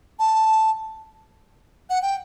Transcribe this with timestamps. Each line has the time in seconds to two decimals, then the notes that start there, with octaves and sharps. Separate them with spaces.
0.19 A5
1.90 F#5
2.02 G5